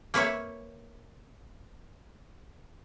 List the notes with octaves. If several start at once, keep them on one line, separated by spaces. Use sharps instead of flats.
A#3 B4 C#5 E5